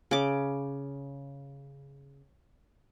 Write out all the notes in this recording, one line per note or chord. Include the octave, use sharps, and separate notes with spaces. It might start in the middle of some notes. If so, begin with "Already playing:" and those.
C#3 D6